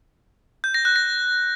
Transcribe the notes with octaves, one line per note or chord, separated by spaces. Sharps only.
G6
A#6
F#6
A#6